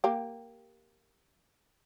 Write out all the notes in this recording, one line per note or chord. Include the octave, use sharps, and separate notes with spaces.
A#3 G4